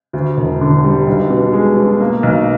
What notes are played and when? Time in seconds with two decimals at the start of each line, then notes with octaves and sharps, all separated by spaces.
0.13 D2
0.37 E1
0.61 D3
0.84 G3
1.07 B1
1.30 B2
1.53 G#3
1.77 B2
2.00 A#3
2.23 B1